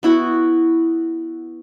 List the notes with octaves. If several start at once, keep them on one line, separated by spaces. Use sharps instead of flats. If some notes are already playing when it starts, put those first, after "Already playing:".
B3 E4 F#4